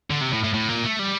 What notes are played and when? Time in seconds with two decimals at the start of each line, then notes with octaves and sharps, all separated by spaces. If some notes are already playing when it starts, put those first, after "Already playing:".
0.10 D3
0.21 C3
0.33 A2
0.44 A2
0.54 A2
0.69 A#2
0.84 A3
0.99 G3